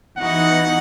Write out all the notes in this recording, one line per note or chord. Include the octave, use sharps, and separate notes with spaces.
E3 B3 D#4 F#4 F#5